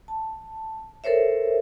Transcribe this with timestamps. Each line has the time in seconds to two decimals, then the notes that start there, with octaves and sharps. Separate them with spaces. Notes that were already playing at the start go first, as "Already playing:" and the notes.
0.08 A5
1.04 A4 A#4 C5 C#5 E5